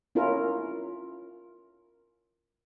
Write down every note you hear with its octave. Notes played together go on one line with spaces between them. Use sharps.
C#4 E4 F4 A#4